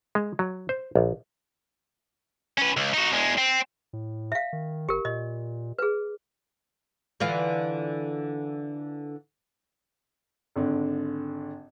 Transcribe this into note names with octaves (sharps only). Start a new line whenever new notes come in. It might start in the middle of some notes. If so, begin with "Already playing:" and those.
G#3
F#3
C5
A#1
C#4 B4
C#2
D#4 F#4
E2 G#3
C4
A2
E5 F5
D#3
F#1 G4 A#4
A#2 D#5
G#4 B4
D3 E3 F4
G#1 D3